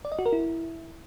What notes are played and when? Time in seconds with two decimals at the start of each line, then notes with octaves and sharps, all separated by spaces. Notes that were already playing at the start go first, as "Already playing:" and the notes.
0.05 D5
0.12 D#5
0.19 F#4
0.26 A#4
0.33 E4